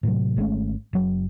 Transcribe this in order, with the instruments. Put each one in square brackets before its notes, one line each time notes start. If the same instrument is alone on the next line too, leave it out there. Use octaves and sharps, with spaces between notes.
[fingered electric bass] A2 C3 F3 F#3
G#1 G#3 A3 C#4
F#1 F#3